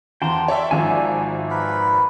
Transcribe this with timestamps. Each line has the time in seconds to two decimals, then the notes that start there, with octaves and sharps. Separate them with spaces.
0.22 E2 F4 C5 G5 A5 A#5 C6
0.48 C#4 C#5 D5 E5
0.71 G#1 G#2 F3 A#3 D5 E5 G#5
1.50 A#4 B4 B5